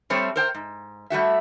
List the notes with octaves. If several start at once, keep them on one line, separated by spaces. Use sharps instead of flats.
G3 A3 C4 A4 C5 C#5
A#4 C5 G5
G#2
G3 A3 F#4 E5